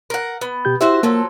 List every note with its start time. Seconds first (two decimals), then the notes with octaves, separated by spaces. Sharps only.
0.10 A#4 F#5
0.41 B3
0.65 B2 G4 G6
0.81 E4 F#4 G4 C5 E5
1.03 F3 F#3 A#3 A4